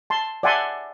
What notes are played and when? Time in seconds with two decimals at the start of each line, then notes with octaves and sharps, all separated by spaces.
0.10 A5 C6
0.43 D5 E5 F#5 G#5 A5 C6